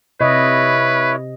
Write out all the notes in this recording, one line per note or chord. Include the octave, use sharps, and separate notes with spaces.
C3 E4 B4 C#5 D#5